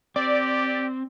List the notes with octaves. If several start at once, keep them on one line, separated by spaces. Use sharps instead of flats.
C4 G4 D5